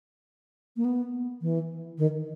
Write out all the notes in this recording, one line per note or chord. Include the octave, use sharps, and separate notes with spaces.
A#3
B3
E3
D#3